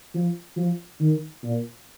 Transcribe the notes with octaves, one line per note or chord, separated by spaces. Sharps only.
F3
F3
D#3
A#2